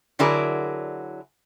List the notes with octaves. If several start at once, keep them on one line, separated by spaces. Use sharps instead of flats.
D3 F#3 E4 G#4 A#4 D5